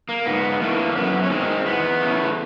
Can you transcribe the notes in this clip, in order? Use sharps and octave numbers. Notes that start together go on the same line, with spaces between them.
A#3
G#2 B3
E3 A3 A#3
C4
F#2 B3
C#4
D#3 G#3 C4
E2 B3
C#3 E3 A3